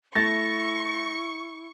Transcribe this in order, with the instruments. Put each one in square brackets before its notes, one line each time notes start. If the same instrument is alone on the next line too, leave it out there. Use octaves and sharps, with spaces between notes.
[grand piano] A3 A6 [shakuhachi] E4 [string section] C#6 [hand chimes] A#6